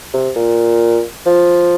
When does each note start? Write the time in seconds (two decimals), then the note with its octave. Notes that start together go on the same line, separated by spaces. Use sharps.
0.14 C3
0.36 A#2
1.26 F3